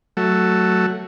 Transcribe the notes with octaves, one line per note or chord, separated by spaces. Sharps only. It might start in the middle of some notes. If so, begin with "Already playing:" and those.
F#3 A3